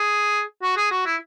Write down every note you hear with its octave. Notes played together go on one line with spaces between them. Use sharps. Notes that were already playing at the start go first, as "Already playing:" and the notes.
Already playing: G#4
F#4
G#4
F#4
E4